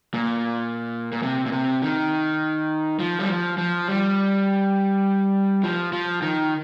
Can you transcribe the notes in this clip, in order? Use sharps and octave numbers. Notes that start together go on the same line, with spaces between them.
A#2
A#2
C3
A#2
C3
D#3
F3
G3
F3
F3
G3
F3
F3
D#3